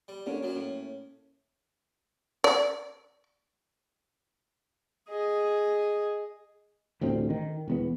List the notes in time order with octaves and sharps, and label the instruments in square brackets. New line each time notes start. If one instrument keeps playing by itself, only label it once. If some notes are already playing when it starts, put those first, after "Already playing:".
[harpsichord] G3
[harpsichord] D3 [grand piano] A#3 C#4
[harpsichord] F#2 F#3
A2
[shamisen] D5
[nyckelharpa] G#4 D#5
[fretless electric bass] A1 D2 A2 C4
D#3
E1 E2 B3